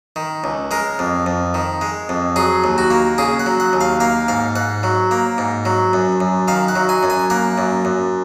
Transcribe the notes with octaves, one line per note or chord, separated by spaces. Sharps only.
D#3
C#2
G#3 A#4
F2
F2
D#3
G#3
F2
F#3 G#4
D#2
F#4
A#3
C#3 G#4
F#5
F#3
F#5
D#2
F5
A#3 F5
G#2 F5
G#2 F#5
F#3
A#3
G#2
F#3
F#2
F#2
D#3 F5
F#5
F#3
G#5
F#2
G#5
A#3 F#5
F#2
F#2